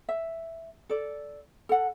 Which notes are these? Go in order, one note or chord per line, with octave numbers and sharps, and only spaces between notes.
E5
A4 D5
A4 F#5